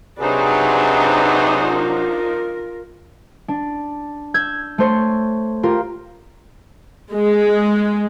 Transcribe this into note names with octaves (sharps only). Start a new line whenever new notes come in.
C3 F#3 D4 D#4 G#4 B4 C5 D5
F4 A#4
D4
E6 G6 G#6
A3 C5 C#5
F4 G4 A#4
G#3